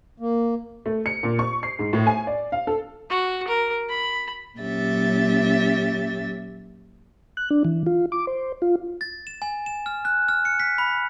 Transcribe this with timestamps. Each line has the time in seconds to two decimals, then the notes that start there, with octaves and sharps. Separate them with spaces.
0.20 A#3
0.86 A3
1.06 C#7
1.23 A#2
1.39 C#6
1.63 C7
1.79 G#2
1.93 A2
2.07 G#5
2.27 D5
2.52 F5
2.67 A4
3.10 F#4
3.47 A#4
3.89 B5
4.59 A#2 F#3 C#4 G4 E5 A6
7.37 F#6
7.50 D4
7.65 E3
7.86 F4
8.12 D6
8.27 C5
8.62 F4
9.01 A6
9.27 E7
9.42 G#5
9.66 E7
9.86 F6
10.05 F#6
10.29 F6
10.45 C#7
10.60 B6
10.78 B5